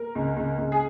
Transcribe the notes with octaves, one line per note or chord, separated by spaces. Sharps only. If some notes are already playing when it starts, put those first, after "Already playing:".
Already playing: A#4
C#2
C#2
C#2
G#4